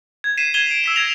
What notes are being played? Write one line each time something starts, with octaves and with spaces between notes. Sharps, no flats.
G#6
B6 C7 D#7 E7
G#6 B6 E7 F7 G7
D7
E6 B6 E7
G#6 A#6 E7 F7